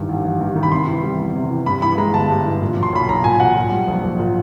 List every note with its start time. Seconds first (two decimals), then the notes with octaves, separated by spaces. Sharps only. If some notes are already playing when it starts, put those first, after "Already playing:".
Already playing: G2 D#3 E3
0.09 A1
0.24 A1
0.41 G2
0.56 D#3
0.63 B5
0.71 C3 C6
0.87 E3
1.03 G3
1.19 E2
1.35 C3
1.50 E3
1.66 G2 B5
1.82 E3 B5
1.98 G#3 A#5
2.14 G1 A5
2.30 G2
2.45 E3
2.62 A#2
2.77 F#3
2.83 C6
2.93 B1 B5
3.09 B1 A#5
3.24 A#2 G#5
3.40 F#3 F#5
3.56 A#2
3.72 G3
3.88 A#1
4.03 A#1
4.19 A#2